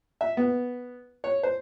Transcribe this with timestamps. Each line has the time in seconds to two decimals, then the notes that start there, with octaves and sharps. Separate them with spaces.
0.21 E5
0.37 B3
1.24 C#5
1.43 C5